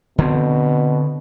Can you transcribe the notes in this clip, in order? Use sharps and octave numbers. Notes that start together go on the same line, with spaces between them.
B2 D3 C4